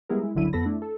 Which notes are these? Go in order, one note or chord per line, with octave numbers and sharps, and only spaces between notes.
G3 G#3 B3 E4 G#4 A#4
G#3 E4
G1 C#2 D3 F#3 E4 D#7
F2 B3 A4 B5 A#6
A3 D4 E4
A4